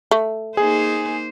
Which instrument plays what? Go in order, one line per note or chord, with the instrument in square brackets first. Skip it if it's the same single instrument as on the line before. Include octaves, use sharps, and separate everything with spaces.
[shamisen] A3
[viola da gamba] A#3 D#4 C5 [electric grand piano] G#4